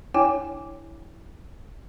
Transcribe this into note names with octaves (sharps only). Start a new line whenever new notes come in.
D4 E4 C#5 G5 G#5 D6